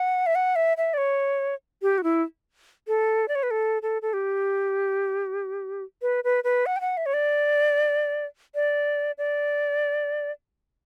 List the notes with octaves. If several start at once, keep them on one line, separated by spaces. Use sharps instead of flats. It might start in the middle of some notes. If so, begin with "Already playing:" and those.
Already playing: F#5
E5
F#5
E5
E5
D5
C#5
G4
F#4
E4
A4
D5
C#5
B4
A4
A4
A4
G4
B4
B4
B4
F#5
G5
F#5
E5
C#5
D5
D5
D5